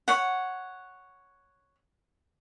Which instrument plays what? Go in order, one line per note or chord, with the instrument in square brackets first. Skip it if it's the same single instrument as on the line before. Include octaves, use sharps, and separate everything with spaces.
[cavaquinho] C#5 F#5